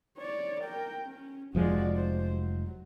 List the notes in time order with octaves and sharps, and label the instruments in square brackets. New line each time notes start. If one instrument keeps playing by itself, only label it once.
[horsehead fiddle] C#5 D5
A#4 G5
C#4
[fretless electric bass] F1 F3 G#3 [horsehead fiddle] F#4 D5
[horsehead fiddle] C5
F#3